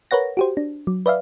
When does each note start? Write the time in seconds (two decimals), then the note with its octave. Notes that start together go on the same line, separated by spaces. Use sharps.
0.11 A#4 B4 C#5 F#5 A#6
0.37 F#4 G4 C5
0.57 D4
0.87 F#3
1.06 B4 D5 E5 F5